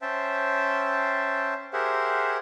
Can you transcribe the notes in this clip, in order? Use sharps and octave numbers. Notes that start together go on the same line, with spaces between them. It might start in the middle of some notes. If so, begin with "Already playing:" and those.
C#4 C5 E5 G5 A5
G4 G#4 A#4 C5 E5 F#5